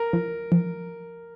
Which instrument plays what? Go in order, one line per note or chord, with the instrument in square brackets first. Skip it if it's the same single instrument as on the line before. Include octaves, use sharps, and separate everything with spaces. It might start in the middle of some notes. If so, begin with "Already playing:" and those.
Already playing: [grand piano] A#4
[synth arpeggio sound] F3
F3